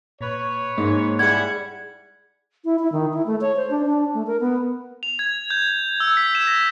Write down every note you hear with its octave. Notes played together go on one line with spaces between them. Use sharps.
A#2 B4 C#5
G#2 A#3
G3 E4 G#4 D5 F#5 G#6
E4
E4
D#3
E4
A3
C#5
C5
D4
D4
A3
A#4
B3
F7
G#6
G6
E6
B6
E7
A#6